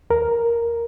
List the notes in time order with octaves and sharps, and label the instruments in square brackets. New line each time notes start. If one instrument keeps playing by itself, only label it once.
[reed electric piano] D#2 A#4